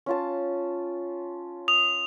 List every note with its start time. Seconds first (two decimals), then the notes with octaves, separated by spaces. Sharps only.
0.06 C#4 F4 A5
1.68 D#6 F7